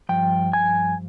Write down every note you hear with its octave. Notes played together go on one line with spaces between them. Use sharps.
G2 F3 G5
G#5